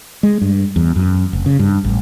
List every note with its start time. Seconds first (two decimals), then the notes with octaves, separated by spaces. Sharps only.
0.23 G#3
0.41 G2
0.76 E2
0.96 F#2
1.33 F1
1.46 C#3
1.59 G2
1.84 A1